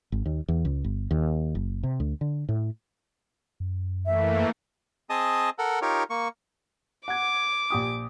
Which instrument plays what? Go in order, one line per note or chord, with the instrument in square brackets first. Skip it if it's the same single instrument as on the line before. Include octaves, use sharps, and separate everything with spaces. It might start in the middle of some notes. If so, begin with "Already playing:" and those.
[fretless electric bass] G#1
D#2
E2
C#2
G1
D#2
F#1
C3
D2
D3
A2
[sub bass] F#2
[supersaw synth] E3 A3 A#3 [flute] E5
[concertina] C4 G#4 D#5 A5 D#6
A4 A#4 F#5
D#4 F4 G4 A#4 C#5
A#3 C#6
[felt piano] F#5 G#6 [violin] D6
[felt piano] A#1 G4 D#6